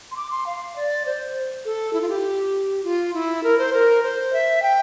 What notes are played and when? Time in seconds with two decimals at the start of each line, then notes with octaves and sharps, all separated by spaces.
0.11 C6
0.17 D6
0.31 C6
0.47 F5
0.76 D5
1.06 C5
1.65 A4
1.93 E4
2.01 F4
2.09 G4
2.84 F4
3.14 E4
3.43 A#4
3.58 C5
3.73 A#4
4.03 C5
4.33 E5
4.62 G5